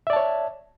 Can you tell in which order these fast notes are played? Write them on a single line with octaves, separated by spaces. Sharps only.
E5 D5 A5 C#5